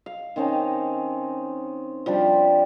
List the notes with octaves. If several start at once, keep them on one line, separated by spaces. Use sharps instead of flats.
F5
D#3 C4 C#4 D#4
F3 G3 D4 G4